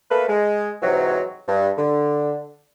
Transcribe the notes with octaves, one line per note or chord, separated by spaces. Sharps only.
A3 A#3 A4 B4
G#3
G#2 C3 E3 F#3
G2
D3